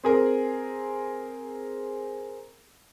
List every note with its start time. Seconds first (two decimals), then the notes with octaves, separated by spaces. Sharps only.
0.04 C4 G#4 A#4